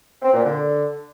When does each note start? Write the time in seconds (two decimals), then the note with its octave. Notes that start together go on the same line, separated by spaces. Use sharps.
0.22 C4
0.33 A#2
0.45 D3